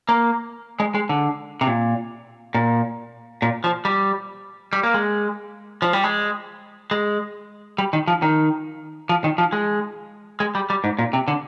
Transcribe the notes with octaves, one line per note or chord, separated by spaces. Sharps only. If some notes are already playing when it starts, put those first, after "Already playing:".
A#3
G#3
G#3
D3
C3
A#2
A#2
A#2
F3
G3
G3
A#3
G#3
F3
G3
G#3
G#3
G3
D#3
F3
D#3
F3
D#3
F3
G#3
G#3
G3
G3
G#2
A#2
C3
D3